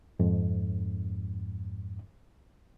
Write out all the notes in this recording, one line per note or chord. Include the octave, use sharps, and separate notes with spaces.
F2 G#2